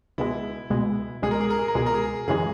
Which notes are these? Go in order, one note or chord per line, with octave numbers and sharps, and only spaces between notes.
C#2 B2 G#3 E4
C#2 B2 G#3
C#2 B2 G#3 G#4
A#4
G#4
A#4
G#4
A#4
C#2 B2 G#3 G#4
A#4
G#4
F#2 C#3 E3 G#3 G#4